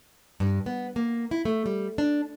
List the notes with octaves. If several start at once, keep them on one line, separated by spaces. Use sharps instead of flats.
G2
B3
A#3
E4
A3
G3
D4